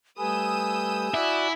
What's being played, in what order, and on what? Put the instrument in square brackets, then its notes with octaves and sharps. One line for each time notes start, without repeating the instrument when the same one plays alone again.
[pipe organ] G3 A3 B4 [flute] G#5 [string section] D#6 E6 G6
[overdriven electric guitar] E4 [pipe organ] F#4 D5 F#6